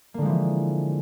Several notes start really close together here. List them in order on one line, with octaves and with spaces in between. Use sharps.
A#3 D3 G#3 F3 E3